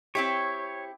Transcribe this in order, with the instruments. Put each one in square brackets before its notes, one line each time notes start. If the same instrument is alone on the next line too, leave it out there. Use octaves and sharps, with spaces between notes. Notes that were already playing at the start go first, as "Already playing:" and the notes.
[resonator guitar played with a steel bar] C4 E4 G4 [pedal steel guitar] C#5